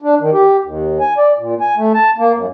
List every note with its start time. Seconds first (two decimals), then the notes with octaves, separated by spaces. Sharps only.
0.02 D4
0.20 D#3
0.33 G4
0.64 D#2
1.00 G#5
1.17 D5
1.39 A#2
1.60 G#5
1.77 A3
1.94 A5
2.18 A#3
2.35 F#2